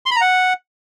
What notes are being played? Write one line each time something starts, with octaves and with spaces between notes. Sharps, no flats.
C6
B5
A#5
F#5